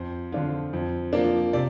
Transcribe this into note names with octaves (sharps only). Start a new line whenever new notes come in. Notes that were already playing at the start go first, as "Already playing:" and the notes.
Already playing: F2 C5
D3 F3 D4 F4
F2
F3 A#3 D4
C3 D5